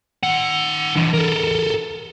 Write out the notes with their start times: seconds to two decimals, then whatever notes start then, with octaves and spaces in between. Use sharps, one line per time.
0.23 D#3 F#5
0.96 E3 D4
1.13 A4 A#4